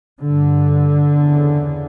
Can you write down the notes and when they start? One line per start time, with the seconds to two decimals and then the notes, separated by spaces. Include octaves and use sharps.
0.20 G2 D3
1.11 E2 C#3